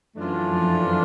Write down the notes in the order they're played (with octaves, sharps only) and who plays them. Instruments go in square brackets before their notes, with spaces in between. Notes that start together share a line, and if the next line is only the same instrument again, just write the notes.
[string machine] F#2 F#3 [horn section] E3 A3 D4 F4
[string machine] F2 F3